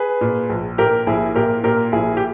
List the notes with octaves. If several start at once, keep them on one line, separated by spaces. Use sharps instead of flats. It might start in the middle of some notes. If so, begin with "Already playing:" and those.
Already playing: G#4 B4
A#2
A#1
A#2 G4 A#4
A#1 E4 G#4
A#2 G4 A#4
A#2 G4 A#4
A#1 E4 G#4
G4